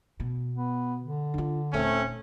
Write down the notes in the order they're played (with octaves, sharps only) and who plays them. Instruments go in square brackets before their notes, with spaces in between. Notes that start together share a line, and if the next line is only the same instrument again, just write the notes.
[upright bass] B2
[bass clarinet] B3
D3
[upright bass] D4 F4
[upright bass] D#1 [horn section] A3 C4 C#4